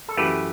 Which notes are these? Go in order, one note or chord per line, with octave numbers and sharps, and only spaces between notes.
A4
F#2 E3 A3 G4 B4